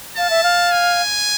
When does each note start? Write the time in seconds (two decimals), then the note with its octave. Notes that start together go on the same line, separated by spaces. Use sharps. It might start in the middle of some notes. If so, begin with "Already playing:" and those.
0.17 F5 A5
0.30 E5
0.44 F5
0.72 G#5